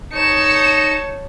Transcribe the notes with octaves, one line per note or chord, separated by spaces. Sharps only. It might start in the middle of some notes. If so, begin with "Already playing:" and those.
D#4 C#5 A5 C#7 E7